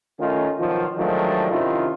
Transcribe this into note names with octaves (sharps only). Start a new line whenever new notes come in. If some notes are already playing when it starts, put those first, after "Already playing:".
D#3 A3 C#4 D#4 F4
B2 D#3 F3 F#3 F4
D#3 F3 F#3 G#3 A3 D4
C3 D#3 C#4 E4 F4